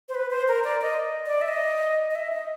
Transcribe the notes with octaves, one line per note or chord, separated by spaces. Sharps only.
C5
B4
C5
A#4
D5
D#5
D5
E5
D#5
D#5
E5
D#5